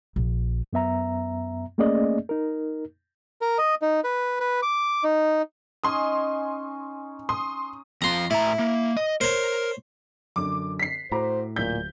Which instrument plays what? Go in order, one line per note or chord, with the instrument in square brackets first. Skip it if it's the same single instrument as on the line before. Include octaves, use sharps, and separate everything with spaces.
[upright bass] A#1
[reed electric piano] F#2 B3 E5 A#5
A3 A#3 C#4 G#4 D5 D#5
D#4 A#4
[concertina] A#4
D#5
D#4
B4
B4
D6
D#4
[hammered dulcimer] C#4 D#4 G#5 [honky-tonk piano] C6 D#6
[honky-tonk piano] C6 D#6
[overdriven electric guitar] F2 F4 [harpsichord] A#5 C6
[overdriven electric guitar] A2 A#5 [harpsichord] E4
[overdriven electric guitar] A#3
D#5
[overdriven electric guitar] A#4 [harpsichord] C5 C#5
[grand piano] F#2 D3 [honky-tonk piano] D6
[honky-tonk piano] B6 C7
[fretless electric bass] A2 [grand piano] F#4 A#5 D6 [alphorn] C5
[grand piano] D1 B6 [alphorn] A#2 [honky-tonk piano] G6